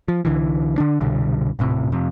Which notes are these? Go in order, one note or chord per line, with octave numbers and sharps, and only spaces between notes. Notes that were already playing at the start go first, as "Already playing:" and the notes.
F3
C2 D3 E3
D3 D4
C2 G2 B2 D3
D#1 A2 C3
F2 C3